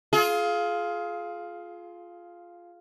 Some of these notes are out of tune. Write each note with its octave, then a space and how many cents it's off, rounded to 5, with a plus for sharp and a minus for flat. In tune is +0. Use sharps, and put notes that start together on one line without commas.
F4 +0 G#4 +30